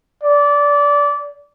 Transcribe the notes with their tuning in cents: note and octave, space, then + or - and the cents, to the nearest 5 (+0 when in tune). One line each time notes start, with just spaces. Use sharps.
D5 -20